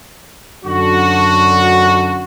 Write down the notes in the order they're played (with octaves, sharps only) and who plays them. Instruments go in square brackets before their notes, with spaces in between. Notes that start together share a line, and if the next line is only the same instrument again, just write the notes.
[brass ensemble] F#2 D3 F#4